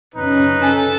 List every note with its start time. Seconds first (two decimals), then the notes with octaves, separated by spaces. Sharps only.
0.15 F#2 C#3 C#4 D#4 B4
0.62 A4 G#5